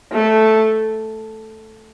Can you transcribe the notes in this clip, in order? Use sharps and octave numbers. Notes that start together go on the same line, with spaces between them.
A3